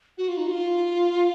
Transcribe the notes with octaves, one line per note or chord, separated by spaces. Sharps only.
F#4
F4
D#4
F#4
F4